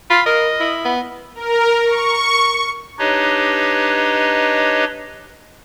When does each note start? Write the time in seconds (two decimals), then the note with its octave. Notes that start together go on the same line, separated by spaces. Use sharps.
0.10 F4 B5
0.26 A#4 D#5
0.60 E4
0.85 B3
1.35 A#4
1.85 C#6
2.99 D4 D#4 G4 B4 C#5 D#5